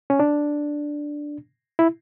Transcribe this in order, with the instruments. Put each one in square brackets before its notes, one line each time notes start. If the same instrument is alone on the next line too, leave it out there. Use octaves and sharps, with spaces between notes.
[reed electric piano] C#4
D4
E4